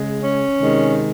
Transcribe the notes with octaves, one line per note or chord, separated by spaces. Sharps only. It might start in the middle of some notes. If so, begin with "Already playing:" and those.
Already playing: C#3 G#3
C#4
C3 D#3 G#3